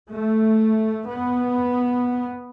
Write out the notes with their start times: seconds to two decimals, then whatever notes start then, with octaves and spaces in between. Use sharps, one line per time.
0.11 A3
1.07 B3